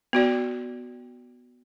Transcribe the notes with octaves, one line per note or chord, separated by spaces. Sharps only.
B3 F#4 D5